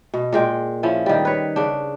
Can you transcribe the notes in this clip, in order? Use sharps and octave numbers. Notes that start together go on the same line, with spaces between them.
B2
A#2 G#3 G5
F3 C#4 E4
D#3 G3
B4 C#5
C#3 D4